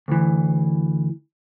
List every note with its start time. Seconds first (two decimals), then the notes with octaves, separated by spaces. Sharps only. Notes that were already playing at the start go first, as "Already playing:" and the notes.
0.08 D2 E3